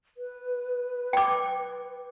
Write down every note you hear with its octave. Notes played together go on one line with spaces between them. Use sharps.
B4
G5 D6